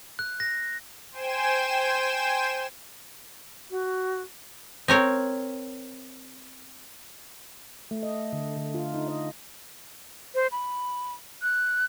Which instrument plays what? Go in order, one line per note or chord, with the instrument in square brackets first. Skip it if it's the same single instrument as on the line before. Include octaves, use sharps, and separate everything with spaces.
[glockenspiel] F#6
A#6
[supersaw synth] C5 G5 G#5 E7
[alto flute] F#4
[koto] C4 A#4 C#5
[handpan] A3
D#5
D3
D3
F4
D#4
D#5
[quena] C5
B5
F#6